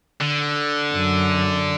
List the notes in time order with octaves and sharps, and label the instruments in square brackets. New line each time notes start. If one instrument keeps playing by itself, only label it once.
[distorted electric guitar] D3
[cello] F#2